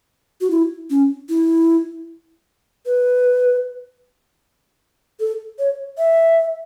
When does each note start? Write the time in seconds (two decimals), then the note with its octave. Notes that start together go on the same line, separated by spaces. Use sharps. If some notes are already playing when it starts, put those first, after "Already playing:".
0.41 F#4
0.51 E4
0.90 C#4
1.29 E4
2.86 B4
5.20 A4
5.59 C#5
5.98 E5